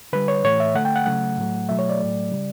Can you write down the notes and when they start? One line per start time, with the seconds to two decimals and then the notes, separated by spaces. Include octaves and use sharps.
0.13 D3 G3 B4
0.28 C#5
0.44 A2 E3 A3 C#5
0.60 E5
0.75 D3 A3 F#5
0.85 G5
0.96 F#5
1.06 C#3 F#3 A3 F#5
1.37 A2 F#3 A3
1.69 B2 F#3 A3 E5
1.79 C#5
1.89 D5
1.99 A2 F#3 A3
2.32 C#3 G3